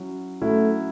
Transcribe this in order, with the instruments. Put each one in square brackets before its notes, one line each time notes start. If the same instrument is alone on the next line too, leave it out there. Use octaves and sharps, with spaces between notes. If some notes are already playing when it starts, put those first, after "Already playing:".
Already playing: [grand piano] F#3 C#4 E4
[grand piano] F#3 C#4 E4 [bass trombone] A3